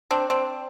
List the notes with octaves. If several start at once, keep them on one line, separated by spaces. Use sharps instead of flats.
C4 D4
C4 D4